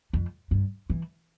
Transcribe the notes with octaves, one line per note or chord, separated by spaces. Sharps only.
F2
G2
E3